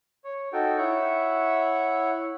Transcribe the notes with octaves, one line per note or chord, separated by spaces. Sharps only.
C#5
D#4 F#4 A4 G5
E4 C#5 E5 F#5